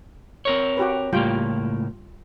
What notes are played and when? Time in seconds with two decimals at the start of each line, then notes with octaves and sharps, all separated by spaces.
0.45 C4 A#4 C#5
0.77 F#4 G4 B4
1.13 C#2 A2 G3 A#3 F4 G5